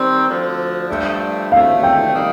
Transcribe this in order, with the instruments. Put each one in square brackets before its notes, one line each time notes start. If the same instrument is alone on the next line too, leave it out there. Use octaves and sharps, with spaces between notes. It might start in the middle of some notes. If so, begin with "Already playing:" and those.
Already playing: [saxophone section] D#3 G3 C4
D2 D3 F3
G2 D3 F3 A3
[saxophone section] D2 D3 A3 [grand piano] F5
[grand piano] G5
[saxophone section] D#3 G3 A#3 D#4